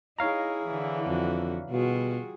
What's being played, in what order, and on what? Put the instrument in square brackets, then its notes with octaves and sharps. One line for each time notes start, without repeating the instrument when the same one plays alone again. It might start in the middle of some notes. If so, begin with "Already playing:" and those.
[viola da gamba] D#4 [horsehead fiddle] E4 G#4 [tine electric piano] C#5 F5 A#5
[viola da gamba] D3 E3
[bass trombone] F2 [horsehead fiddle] D4 F#4
[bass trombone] B2 [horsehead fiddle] G3 G#4 [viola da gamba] F4 F#4